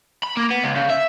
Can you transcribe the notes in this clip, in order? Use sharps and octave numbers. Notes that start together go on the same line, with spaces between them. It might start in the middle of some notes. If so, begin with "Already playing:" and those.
B5
A#3
B3
C#2
C#3
E5